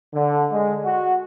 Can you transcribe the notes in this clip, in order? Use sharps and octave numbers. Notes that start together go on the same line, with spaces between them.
D3
G#3
F#4